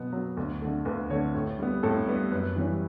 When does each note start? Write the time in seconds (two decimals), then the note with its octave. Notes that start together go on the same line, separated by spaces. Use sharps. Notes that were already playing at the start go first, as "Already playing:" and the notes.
Already playing: B2 F#3 B3
0.13 F#3 B3
0.37 D2
0.62 D3 A3
0.85 D2 B4
1.10 D3 A3 C#5
1.34 A2
1.59 G3 B3
1.83 A2 A4
2.07 G3 B3 B4
2.32 F#2 B4
2.56 E3 G3 C#4